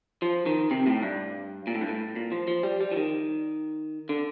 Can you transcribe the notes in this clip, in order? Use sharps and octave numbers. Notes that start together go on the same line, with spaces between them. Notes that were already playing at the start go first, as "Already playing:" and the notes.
F3
D#3
C3
A2
G2
A#2
A2
G2
A2
A#2
F3
F3
G3
G3
F3
D#3
D3